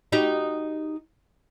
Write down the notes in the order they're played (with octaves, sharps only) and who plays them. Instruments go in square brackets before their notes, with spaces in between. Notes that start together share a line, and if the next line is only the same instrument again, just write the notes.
[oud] D#4 F#4 G4